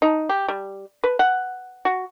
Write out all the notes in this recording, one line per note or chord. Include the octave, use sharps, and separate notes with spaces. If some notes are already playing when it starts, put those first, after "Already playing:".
D#4
G4
G3
B4
F#5
F#4